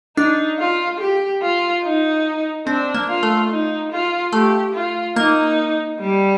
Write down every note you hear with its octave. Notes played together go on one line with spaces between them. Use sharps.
D4 D#4
F4
G4
F4
D#4
C4 D4
A#3
F4
A3
D#4
F4
A3 G4
F4
A#3 D#4
G3